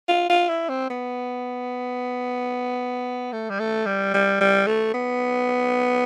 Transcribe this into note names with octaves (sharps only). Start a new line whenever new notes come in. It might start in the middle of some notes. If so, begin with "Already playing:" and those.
F4
F4
E4
C4
B3
A3
G3
A3
G3
G3
G3
A3
B3